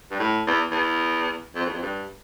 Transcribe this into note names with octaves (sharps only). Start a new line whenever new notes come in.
G2
A2
E2
E2
F2
E2
F2
G2